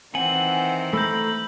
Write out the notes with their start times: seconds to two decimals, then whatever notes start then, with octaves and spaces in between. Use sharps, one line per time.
0.15 D#3 E3 C4 F#5 G#5 F#7
0.93 A3 A#5 B5 E6 G6